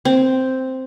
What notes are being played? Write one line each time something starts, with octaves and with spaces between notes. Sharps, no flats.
C4